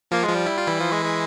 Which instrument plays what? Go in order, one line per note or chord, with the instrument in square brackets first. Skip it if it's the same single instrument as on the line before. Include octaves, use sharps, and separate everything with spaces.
[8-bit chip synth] F3 F4 [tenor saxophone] A#3
[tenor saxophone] G#3
[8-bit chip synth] F3 F4
[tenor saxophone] G3
[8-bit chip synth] E4
F4
E3 E4
[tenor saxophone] F3
G#3
G#3